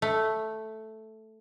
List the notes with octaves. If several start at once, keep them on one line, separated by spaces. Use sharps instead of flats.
A3